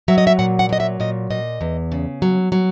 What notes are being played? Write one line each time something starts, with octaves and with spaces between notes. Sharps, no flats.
F#3 E5
D#5
E5
A#2 F#5
F#5
F#3 D#5
E5
A#2 D#5
A#2 D#5
E2
C#3
F#3
F#3